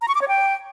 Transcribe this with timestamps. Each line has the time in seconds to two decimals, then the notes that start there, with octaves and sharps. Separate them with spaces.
0.02 A#5
0.08 C#6
0.15 D6
0.22 C#5
0.28 G5